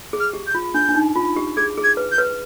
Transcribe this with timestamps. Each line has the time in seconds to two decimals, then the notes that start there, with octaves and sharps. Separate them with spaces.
0.13 G#4
0.20 F6
0.33 G4
0.47 G6
0.55 F4
0.74 D4 G6
0.89 D4
0.95 D#4
1.15 F4
1.36 G4
1.57 G#4 G#6
1.77 G#4
1.84 G#6
1.97 B4
2.12 G6
2.18 B4